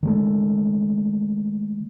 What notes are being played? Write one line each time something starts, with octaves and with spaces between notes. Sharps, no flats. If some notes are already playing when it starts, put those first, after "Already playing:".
D#3 G#3 A3